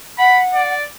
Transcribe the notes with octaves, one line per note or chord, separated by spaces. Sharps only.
F#5 B5
D5